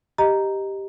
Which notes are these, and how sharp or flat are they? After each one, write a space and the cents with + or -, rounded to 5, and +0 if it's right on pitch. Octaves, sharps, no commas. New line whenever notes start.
G4 +0 D#5 +0 A#5 +0